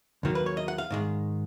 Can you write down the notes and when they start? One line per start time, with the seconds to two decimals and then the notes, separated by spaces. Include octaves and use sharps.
0.23 D#2 D#3 F#3 A#3
0.35 B4
0.46 C#5
0.57 D#5
0.68 F#5
0.78 F5
0.91 G#2 D#3 G#3